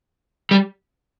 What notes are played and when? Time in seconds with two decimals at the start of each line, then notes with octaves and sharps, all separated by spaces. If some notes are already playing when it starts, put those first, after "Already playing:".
0.51 G3